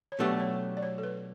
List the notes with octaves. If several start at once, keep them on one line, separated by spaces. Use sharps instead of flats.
C#5
B2 F#3 A3 D4 G4 B4
C#5
D5
C#5
A4
B4